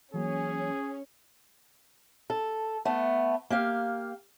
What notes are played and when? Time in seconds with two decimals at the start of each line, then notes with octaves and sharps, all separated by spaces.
0.14 E3 F#3 A#3 C#4 G#4
2.30 A4
2.85 A3 B3
3.50 A#3 G4 F5